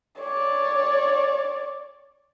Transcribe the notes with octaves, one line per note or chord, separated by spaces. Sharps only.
C#5 D5